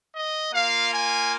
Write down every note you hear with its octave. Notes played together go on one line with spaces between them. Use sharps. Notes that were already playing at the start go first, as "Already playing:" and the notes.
D#5
A#3 F4 F5
G#5